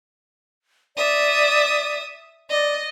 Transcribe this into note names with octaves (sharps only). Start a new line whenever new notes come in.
D5 E5 D#6
D5 D#5